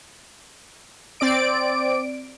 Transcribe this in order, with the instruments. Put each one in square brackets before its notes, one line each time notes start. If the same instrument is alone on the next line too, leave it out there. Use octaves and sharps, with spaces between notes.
[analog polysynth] C4 D5 D7